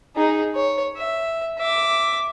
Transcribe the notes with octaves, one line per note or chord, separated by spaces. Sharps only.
D#4 G#4
C#5
E5
E5 D6